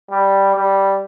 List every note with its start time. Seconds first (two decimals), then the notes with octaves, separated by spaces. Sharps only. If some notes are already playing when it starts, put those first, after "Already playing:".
0.10 G3
0.56 G3